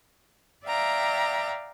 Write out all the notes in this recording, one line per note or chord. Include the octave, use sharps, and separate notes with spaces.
D5 E5 F5 G5 A#5